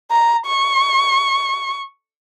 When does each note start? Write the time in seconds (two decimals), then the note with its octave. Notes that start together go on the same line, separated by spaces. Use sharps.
0.11 A#5
0.47 C#6